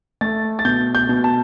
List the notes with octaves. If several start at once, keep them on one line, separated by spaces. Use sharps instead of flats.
A3 A6
A6
B2 G6
G6
B2
A5